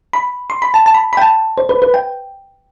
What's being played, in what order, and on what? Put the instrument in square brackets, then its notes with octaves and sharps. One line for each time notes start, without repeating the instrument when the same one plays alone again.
[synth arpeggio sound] B5
C6
B5
A5
A5
B5
B5
G5
A5
C5
B4
B4
G5